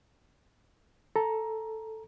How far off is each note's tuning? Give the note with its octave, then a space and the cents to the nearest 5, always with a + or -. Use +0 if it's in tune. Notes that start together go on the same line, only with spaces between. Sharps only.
A4 +0 A#5 +10